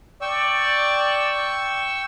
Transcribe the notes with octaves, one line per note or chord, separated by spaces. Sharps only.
D5 G5 C#6 E6